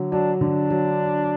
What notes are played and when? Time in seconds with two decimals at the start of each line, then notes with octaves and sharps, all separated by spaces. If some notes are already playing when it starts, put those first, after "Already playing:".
Already playing: D3 F#3
0.12 F#3 D4
0.41 D3 D4
0.70 F#3